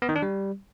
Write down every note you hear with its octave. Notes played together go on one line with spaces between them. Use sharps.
B3
D#3
D4
G3